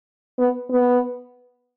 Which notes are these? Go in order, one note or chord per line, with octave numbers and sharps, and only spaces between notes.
B3
B3